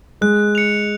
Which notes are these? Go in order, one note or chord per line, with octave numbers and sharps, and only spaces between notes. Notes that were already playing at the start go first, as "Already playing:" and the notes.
G#3 F#6
C#7 F7